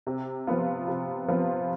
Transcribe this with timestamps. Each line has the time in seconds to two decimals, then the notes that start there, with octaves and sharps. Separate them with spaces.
0.07 C3
0.47 F3 B3 F4
0.88 C3
1.28 F3 B3 F4